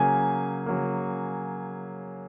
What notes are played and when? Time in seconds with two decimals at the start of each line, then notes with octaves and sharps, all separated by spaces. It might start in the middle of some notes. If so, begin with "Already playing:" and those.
Already playing: C#3 F#3 A#3 G#5
0.66 C#3 F#3 A#3